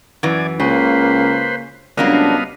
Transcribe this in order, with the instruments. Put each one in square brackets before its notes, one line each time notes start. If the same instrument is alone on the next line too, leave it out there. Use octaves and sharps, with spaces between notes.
[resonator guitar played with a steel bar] F#2 E3 [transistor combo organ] D5 G#5
[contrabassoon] C#2 [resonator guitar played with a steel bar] C#3 [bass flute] A#3 [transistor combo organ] B4 C5
[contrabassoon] C#2 [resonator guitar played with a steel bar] F#3 A#3 D4 [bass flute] G3 [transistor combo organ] B3 D#5 F5